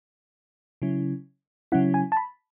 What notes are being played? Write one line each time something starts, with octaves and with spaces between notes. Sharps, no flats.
C#3 F#3 C#4 E4
C#3 F#3 C#4 E4 F#5
G#5
A5
B5